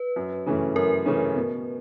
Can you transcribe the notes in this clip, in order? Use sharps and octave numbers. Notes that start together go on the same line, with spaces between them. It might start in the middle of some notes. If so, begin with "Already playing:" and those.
Already playing: B4
F#2
C#3 E3 A3 C#4
F#2 A#4
C#3 E3 A3 C#4
B2